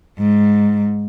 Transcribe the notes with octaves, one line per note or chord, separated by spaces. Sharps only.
G#2